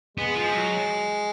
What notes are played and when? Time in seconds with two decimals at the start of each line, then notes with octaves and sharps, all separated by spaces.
0.17 G#3 B3
0.35 F3
0.53 F#3